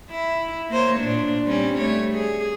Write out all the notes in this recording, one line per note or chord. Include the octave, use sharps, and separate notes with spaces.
E4
A#3 C5 C#5
A#2 D4
G3 C4 C#4
G3 A3 C#5
G#4